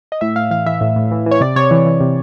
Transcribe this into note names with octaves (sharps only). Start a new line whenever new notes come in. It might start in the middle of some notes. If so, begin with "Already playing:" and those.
D#5
A2 E5
A2 F5
E3 F5
E3 E5
A2
A2
E3
E3
C#5
C3 D5
C3 C#5
E3
E3
C3